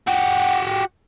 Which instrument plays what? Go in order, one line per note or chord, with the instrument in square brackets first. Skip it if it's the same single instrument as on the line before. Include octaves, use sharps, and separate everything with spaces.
[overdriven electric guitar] F#4 G4